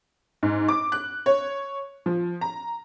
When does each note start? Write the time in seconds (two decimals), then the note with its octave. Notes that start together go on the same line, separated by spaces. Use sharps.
0.43 G#2
0.68 D6
0.92 F#6
1.26 C#5
2.06 F3
2.41 A#5